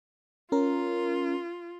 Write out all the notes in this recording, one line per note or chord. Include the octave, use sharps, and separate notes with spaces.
C#4 F4 A#4